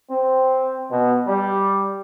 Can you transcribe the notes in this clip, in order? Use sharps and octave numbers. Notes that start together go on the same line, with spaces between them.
C4
B2
G3